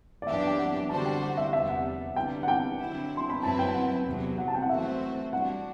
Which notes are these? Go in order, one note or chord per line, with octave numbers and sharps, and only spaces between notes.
D5
F#2 E3 B3 D4 G4 E5
G5
F#5
D3 G3 D4 F#4 C5 A5
G5
F#5
E5
E2 C3 G3 B3 E5
F#5
E2 D3 G3 B3 G5
F#5
G5
D3 F#3 C4 E4
C6
B5
F#2 F#3 C4 E4 B4 A5
G5
F#5
E2 C3 F#3
F#5
A5
G5
F#5
E3 A3 C4 F#4 C5 E5
G3 D4 F#4 F#5